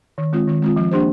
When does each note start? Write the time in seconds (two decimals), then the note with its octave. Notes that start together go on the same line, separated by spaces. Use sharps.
0.18 D#3
0.33 G#3 C4 F4
0.47 D#3
0.62 G#3 C4 F4
0.76 F3
0.91 A#3 D4 G4 C5